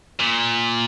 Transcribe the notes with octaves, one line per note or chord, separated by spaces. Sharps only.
A#2